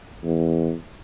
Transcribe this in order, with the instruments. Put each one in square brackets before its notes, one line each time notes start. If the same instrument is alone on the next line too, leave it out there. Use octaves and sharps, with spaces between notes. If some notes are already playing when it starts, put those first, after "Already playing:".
[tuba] E2